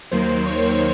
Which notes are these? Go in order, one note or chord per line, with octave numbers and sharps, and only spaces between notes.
D#2 D#3 F#3 A#3 C5
C#5